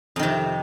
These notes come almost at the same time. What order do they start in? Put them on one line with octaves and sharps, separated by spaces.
F2 D#3 C3